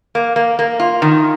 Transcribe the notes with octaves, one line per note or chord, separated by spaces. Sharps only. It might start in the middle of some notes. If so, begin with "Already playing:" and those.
A#3
A#3
A#3
F4
D#3